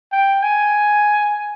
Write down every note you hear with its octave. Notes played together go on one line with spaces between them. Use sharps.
G5
G#5